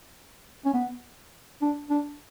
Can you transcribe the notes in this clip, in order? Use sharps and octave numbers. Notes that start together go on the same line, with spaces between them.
C#4
B3
D4
D4